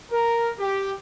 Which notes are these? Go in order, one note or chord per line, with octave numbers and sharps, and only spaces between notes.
A#4
G4